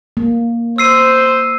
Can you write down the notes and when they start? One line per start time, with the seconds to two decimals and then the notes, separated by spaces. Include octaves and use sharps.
0.17 A#3
0.78 C5 E6 C7 D#7